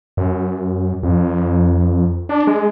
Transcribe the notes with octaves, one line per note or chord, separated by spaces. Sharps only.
F#2
F2
D4
G#3